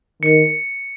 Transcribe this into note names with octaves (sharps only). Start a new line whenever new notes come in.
D#3 C#7